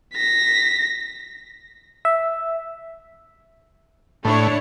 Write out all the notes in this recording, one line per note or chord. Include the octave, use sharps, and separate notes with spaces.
A#6 B6
E5
A2 D4 E4 C#5